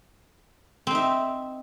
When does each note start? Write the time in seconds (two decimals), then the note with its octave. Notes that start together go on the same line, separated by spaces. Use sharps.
0.87 C4
0.91 D#4
0.95 E5